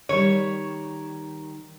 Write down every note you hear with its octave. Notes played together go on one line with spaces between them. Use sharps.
D#3 G3 C#5